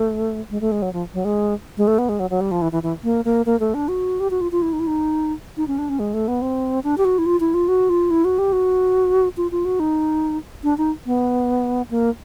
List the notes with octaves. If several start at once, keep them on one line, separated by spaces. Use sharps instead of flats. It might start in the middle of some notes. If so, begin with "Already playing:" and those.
Already playing: A3
G#3
A3
G#3
F#3
F3
F#3
G#3
G#3
A3
B3
G#3
F#3
F#3
G3
F3
E3
E3
E3
A#3
A#3
A#3
A3
D4
F#4
G4
F#4
F4
F4
E4
D#4
E4
D#4
D#4
C#4
D4
C#4
G#3
A3
B3
C4
D4
G4
F#4
E4
F4
E4
F4
F#4
F4
E4
F#4
G4
F#4
F4
F4
F#4
D#4
D4
D#4
B3
A#3